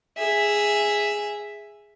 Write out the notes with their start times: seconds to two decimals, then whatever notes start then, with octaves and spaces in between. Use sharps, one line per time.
0.18 G#4 E5